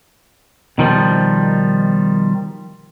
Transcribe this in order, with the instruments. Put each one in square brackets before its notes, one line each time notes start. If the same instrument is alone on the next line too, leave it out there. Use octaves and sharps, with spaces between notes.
[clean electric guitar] B2 D#3 F3 G3